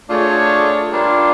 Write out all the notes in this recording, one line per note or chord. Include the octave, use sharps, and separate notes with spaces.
A3 D4 F4 G#4 C#5
G3 A#3 D4 F4